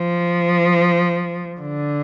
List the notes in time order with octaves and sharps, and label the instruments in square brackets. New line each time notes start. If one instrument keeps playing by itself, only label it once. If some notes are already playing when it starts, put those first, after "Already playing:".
Already playing: [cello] F3
D3